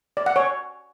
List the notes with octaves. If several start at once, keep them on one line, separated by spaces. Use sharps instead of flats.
D5
F#5
C#5